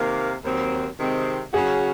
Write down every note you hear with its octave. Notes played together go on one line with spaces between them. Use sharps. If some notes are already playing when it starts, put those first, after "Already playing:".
Already playing: C3 D#3 A#3
D#2 D#3 F#3 C4
C3 D#3 G#3 C4
C#3 F#3 C#4 F#4 G#4